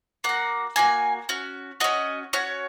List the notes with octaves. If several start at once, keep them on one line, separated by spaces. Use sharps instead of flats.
A#3 F#4 F#5
A#3 D#4 F#4 G#5
C#4 F#4
C#4 F#4 D#5
C#4 F#4 C#5